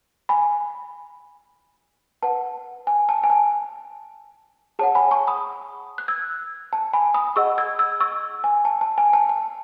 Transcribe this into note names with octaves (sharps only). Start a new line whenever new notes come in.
G#5 B5
B4 F#5 A5
G#5
A5
G#5
A5
G#4 C#5 F#5 A5
G#5 B5
A5 C#6
B5 D#6
F#6
E6 G#6
A5
G#5 B5
B5 D#6
G#4 D#5 F#5 C#6 E6
E6 G#6
E6 G#6
C#6 E6
G#5
A5
A5
G#5
A5
A5